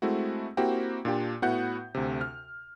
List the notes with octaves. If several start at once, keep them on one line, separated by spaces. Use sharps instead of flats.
G#3 A3 C4 E4 F#4
A#3 C4 E4 F#4 G4
A#2 D4 F4 G4
A2 B3 E4 F#4 F#5 G6
D2 C3
F6